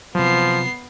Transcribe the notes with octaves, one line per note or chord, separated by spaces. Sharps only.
C3 F3 F#3 B3 C7